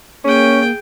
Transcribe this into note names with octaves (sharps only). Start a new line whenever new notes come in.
A#3 C#4 G#4 G5